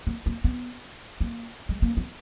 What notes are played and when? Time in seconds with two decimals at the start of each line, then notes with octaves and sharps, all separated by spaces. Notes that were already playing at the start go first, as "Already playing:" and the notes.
0.07 A#3
0.26 A#3
0.44 B3
1.21 A#3
1.69 G#3
1.82 A#3
1.97 B3